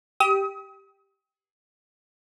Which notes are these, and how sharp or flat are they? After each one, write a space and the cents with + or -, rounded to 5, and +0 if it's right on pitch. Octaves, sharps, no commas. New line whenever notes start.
G4 +0 D#6 +35